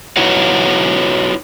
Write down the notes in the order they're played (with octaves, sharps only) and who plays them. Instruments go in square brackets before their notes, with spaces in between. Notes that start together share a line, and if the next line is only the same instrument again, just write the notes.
[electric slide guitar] D#4 E4 F#4 B4 C#5 F#5